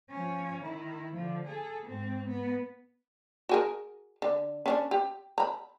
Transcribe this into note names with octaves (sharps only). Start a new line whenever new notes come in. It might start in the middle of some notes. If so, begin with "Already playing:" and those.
F3 C#4
D#3 E4
D3 F3
G#4 A4
G#2 C4
B3
F#4 G#4 A#4
D3
C#4 D4 C#5
G4
A#5 B5